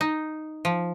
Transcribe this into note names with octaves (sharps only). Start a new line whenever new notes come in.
D#4
F3